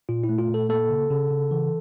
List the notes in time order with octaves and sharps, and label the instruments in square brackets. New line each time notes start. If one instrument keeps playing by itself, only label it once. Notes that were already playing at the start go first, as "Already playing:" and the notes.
[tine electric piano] A#2 F4
E4
A3
F4
A#2 A4
A#3 A4
C#3
C#3
C#3
E3